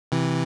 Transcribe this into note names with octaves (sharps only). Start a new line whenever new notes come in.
C3 E3